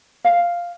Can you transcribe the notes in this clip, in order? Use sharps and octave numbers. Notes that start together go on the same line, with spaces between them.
F5